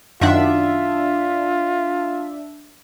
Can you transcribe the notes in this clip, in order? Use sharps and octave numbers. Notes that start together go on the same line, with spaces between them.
F#2 D#3 D4 F4 E5 F#5